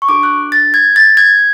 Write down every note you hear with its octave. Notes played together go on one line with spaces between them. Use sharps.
C#6
D4 F#4 A4 D6
F#6
A6
G#6
A6
G#6